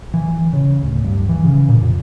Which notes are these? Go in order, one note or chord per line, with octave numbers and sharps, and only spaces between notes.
E3
C#3
D1
G2
E3
C#3
A#2
F2